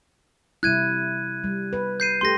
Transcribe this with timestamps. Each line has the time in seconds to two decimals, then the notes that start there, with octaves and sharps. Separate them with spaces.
0.63 C3 G3 E4 F#6 G#6 D#7
1.44 G3
1.73 B4
2.00 G6 C7 D#7
2.21 A3 G4 A4 C6 A#6